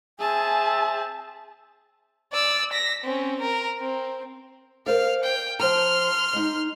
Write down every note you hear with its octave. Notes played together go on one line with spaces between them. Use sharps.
C4 G#4 E5 G#5 A5
D5 E6
A#6 B6
C4 C#4
A#4
C4
A#4 C5 D5 F5
G5
F3 A#5 C6 F6
G#3 D#4